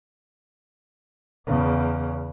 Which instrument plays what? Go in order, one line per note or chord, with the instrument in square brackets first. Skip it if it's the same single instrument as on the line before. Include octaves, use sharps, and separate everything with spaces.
[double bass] E2 C#3